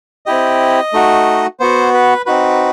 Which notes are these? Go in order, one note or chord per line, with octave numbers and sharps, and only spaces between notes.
C4 E4 G4 D#5
A3 D#4 F#4
B3 F#4 C5
B4
C4 D#4 F#4 B4